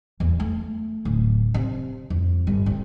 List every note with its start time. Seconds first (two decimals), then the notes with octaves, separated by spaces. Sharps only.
0.20 E2
0.40 A3
1.05 D1
1.54 C3
2.10 F2
2.47 G1
2.66 C3